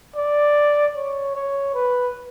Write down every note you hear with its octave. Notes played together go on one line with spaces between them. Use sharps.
D5
C#5
C#5
B4